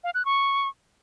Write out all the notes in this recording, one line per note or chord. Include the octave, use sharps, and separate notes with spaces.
F5
F#6
C#6